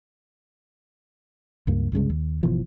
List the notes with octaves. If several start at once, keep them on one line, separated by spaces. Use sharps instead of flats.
C#2 G2 A#3
C2 G2 C#3 G#3
D#2
G1 B2 E3 F3